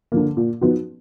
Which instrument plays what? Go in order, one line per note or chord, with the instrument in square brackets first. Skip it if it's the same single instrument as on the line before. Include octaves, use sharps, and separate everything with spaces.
[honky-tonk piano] D3 F3 A#3
A#2
F3 B3 D#4 F#4